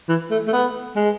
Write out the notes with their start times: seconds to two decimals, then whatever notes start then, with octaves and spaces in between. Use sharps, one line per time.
0.09 E3
0.31 A3
0.48 A3
0.53 B3
0.96 G#3